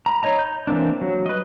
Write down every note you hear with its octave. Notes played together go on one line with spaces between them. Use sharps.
A#5 B5
D#4 C#5 D#5 A#5
G6
E3 A#3 C4 D4
F#3
B4 D#5